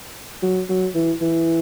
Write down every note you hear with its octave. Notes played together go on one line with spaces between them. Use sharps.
F#3
F#3
E3
E3